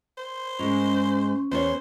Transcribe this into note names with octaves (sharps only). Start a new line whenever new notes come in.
C5
G#2 G#3 C#4
E2 C5 C#5